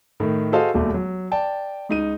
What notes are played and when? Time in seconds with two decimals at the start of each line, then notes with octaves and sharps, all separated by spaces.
0.20 A2 D#3
0.52 F#4 G#4 A4 C5 D#5 F5
0.74 E1 D#2 A3
0.94 F#3
1.31 D5 G5 A5
1.89 C#2 D#4 D#7